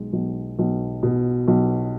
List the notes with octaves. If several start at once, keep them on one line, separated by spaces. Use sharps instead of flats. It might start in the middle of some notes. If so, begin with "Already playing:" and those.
Already playing: B1 G#3
B1
B1
B2
B1